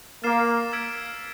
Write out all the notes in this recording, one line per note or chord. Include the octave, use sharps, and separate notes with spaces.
A#3 F6 A6 C7 E7
E6 G#6 B6 D7